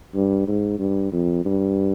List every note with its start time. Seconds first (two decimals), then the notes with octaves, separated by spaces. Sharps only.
0.15 G2
0.48 G#2
0.79 G2
1.12 F2
1.45 G2